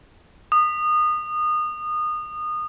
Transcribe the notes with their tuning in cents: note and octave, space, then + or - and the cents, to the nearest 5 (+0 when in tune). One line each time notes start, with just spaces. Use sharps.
D#6 -25